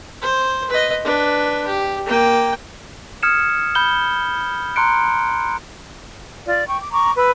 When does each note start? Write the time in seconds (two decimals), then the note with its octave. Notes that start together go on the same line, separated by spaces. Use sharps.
0.22 C5
0.70 B4 D#5
1.05 D4 B4
1.66 G4
2.06 A#3 G5
3.23 D#6 F6 G#6 C#7 E7
3.75 B5 G6 G7
4.76 A#5 C6 F#6 C#7 D7
6.46 F4 D5
6.67 G5 C#6
6.79 D6
6.93 A#5 C#6 D6
7.16 B4 E6